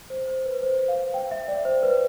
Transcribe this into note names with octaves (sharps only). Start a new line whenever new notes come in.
C5
C5
B4
C5
F5
G5
E5
D5
C5
B4